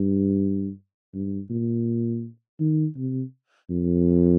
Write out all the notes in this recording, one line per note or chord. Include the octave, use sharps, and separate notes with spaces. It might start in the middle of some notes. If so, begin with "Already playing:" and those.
Already playing: G2
G2
A#2
D#3
C3
F2